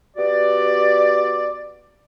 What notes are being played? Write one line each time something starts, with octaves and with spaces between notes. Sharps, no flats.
B3 F#4 G4 D5